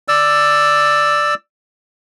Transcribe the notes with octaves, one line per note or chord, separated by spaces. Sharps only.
D5 E6